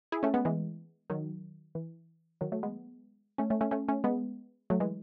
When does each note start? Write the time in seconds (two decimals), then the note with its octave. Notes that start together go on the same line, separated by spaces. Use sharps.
0.12 E4 G#4
0.23 A3 C#4
0.34 G#3 B3
0.45 E3 G#3
1.10 D#3 F#3
1.75 E3
2.41 D#3 F#3
2.52 F#3 A3
2.63 G#3 B3
3.38 A3 C#4
3.50 A3 C#4
3.61 A3 C#4
3.71 A3 C#4
3.88 A3 C#4
4.04 G#3 B3
4.70 F#3 A3
4.80 E3 G#3